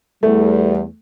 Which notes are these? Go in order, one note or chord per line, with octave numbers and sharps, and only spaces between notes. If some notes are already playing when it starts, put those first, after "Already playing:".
E2 G3 A3